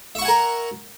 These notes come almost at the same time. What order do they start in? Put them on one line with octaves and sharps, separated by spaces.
E5 C#6 F#5 G#5 A#4